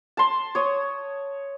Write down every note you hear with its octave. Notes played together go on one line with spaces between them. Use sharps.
A5 C6
C#5 D#6